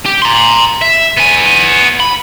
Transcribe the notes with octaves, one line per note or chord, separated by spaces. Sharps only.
G4
A#5 C6
E5
B3 G#5
B5